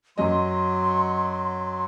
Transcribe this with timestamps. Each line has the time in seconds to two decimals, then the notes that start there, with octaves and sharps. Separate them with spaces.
0.18 F#2 F#3 D#5 C6